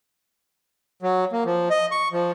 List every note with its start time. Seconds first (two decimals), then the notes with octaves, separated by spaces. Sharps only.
1.02 F#3
1.32 A#3
1.46 F3
1.70 D#5
1.92 C#6
2.12 F3